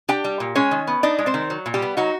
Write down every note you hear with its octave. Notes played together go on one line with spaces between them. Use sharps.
D4 G4 G5
G3
A#2
G#3 C#4 C#5
D#3
B3
D4 D#4 D5
G#3
C4 C5
D#3
F#3
A#2
G3 G4
B3
F#3 D#4 F#4